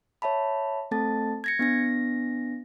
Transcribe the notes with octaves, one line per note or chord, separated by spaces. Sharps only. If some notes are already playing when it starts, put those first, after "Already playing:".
C#5 E5 A5 B5
A3 C4 A4 A5 A6
G#6 A#6 C#7
B3 D4 A#6